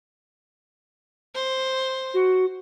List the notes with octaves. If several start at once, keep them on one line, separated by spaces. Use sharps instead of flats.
C5
F#4